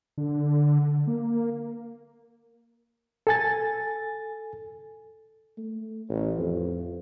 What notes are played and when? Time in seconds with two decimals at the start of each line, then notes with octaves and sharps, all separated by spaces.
0.18 D3
1.07 A#3
3.27 A4 G#5 A6
5.58 A3
6.09 A1
6.38 F2